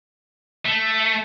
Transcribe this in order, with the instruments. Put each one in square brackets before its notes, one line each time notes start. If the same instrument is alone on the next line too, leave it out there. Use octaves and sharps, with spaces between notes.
[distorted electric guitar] A3